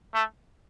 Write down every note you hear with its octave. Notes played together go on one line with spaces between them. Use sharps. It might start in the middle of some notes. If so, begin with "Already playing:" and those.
A3